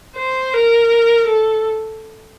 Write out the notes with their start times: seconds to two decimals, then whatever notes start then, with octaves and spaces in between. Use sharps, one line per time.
0.16 C5
0.54 A#4
1.27 A4